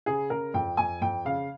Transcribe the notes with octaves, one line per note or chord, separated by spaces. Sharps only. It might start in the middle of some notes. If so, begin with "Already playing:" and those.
C#3 G#4
C#3 A#4
F2 G5
F2 G#5
F2 G5
C#3 F5